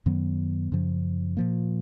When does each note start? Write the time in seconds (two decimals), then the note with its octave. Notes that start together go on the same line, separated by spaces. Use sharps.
0.06 F#2 D#3 F#3 B3
0.72 F#2 C#3 F3
1.37 A#2 F3 A#3